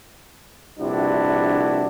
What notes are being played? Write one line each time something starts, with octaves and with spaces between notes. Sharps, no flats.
A#1 G2 C3 D4 E4 F#4